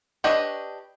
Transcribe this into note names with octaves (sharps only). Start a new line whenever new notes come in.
D4 G4 B4 C#5 D#5